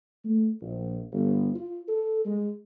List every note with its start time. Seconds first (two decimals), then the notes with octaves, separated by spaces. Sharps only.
0.24 A3
0.60 A#1
1.12 G1
1.54 F4
1.88 A4
2.26 G#3